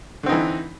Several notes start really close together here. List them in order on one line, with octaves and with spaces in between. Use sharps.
D3 C4 D#4 E3